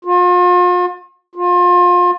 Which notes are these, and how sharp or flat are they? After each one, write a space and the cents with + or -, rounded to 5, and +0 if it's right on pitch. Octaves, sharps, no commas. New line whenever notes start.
F4 +40
F4 +30